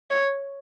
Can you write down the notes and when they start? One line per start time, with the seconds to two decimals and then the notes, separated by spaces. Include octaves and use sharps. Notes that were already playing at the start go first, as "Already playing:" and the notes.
0.10 C#5